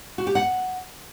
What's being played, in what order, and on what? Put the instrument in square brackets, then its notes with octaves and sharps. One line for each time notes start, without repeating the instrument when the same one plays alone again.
[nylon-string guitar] F#4
G4
F#5